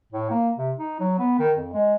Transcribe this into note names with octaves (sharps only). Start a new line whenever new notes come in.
A2
A#3
C3
D#4
F#3
B3
D#3
F2
G#3